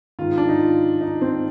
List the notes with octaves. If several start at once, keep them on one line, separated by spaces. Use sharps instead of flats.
G#2 D#3 F4
D4
D#4
F4
D#4
C4